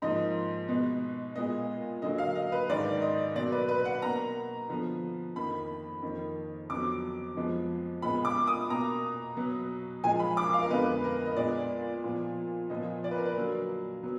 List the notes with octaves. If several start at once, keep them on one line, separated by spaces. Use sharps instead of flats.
G#2 F3 A#3 D#5
B2 G#3 B3
A#2 G#3 B3 D#5
D3 F#3 A#3 D#5
F5
D#5
B4
G#2 D#3 G#3 D5
D#5
B2 F#3 A#3 D5
B4
B4
F#5
B2 A#3 A#5
D3 F3 B3
F2 D#3 A#3 B5
F2 D#3 A#3
F2 D3 F#3 B3 D6
F2 F3 G#3 B3
A#2 G#3 B3 B5
D6
D#6
B2 A#3 A#5
B2 F#3 B3
A#2 F3 G#3 G#5
B5
D6
F5
A#4
F2 D3 G#3 B3 B4
A#4
D#5
A#2 G#3 B3 D5
A#2 F3 B3
A#2 F3 B3 D#5
D5
B4
A#4
B4
D3 F#3 A#3
F#3 B3